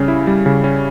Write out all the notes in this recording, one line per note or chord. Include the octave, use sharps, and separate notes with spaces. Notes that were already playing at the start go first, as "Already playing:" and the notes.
Already playing: C#3 G3 C#4
E4
G3
C#3
C#4